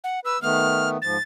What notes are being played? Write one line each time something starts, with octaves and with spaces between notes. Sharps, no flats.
F#5
B4 E6
D#3 A3 B3 F6
G#2 F3 A6